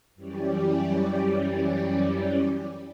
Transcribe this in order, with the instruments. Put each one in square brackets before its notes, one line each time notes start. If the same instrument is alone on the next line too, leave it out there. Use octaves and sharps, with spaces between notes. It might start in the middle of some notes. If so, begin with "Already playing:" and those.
[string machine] F#2 E3 G3 C#4 G4 D5